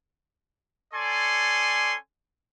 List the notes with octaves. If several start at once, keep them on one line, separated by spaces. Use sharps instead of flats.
C#4 A4 D5 G#5 C6